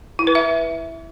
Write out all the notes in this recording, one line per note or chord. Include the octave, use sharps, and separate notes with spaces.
E4
B4
E5